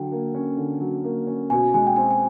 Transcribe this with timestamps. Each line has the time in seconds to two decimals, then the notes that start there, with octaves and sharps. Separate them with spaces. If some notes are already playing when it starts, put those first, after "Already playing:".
Already playing: D3 F#3 G5
0.12 A#3
0.35 C#4
0.57 D3
0.80 F#3
1.04 A#3
1.27 C#4
1.50 B2 G#5
1.74 G#3 G#5
1.87 G5
1.96 C4 G#5
2.11 G#5